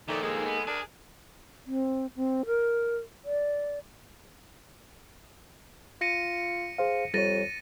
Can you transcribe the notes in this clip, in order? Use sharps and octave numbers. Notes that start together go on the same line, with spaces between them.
A#2 D#3 F3 D#4 A4 E5
G#3 A#3 D#4 G#4
B3
D4 G#4 A#4
C4
C4
A#4
D5
F4 A#6 C#7 D#7
G#4 C5 F5
F2 G3 C#5 A6 A#6 D#7